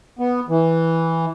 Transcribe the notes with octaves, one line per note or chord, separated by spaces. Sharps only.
B3
E3